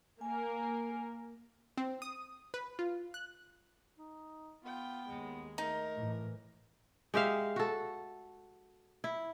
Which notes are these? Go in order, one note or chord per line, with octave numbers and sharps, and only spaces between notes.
A#3 A#4 G#5
C4
D#6
B4
F4
F#6
D#4
B3 F4 G5
D#2 G#3
A3 D#4 A#4
A2 E3
G#3 G4 E5 F5
F#4 A4
E4